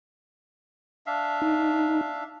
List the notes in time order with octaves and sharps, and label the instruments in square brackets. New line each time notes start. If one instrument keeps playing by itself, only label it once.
[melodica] D4 E5 F5
[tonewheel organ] D#4